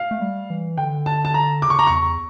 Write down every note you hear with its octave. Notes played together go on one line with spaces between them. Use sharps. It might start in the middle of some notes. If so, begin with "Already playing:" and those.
Already playing: F5
A3
G3
E3
D3 G5
A5
A5
A#5
C#3 D6
C#6
A#5
E2 C#6